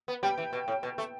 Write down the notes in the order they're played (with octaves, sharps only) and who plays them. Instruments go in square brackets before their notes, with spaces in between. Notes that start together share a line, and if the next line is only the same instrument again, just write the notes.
[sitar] B3
[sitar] G3 [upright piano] G5
[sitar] E3
B2
A2
B2
A3